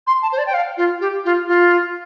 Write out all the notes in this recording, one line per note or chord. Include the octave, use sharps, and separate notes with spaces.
C6
A5
C5
D5
G5
F5
F4
G4
F4
F4